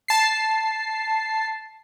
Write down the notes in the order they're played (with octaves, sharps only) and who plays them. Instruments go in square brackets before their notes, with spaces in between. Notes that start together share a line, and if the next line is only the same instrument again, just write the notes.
[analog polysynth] A5 C7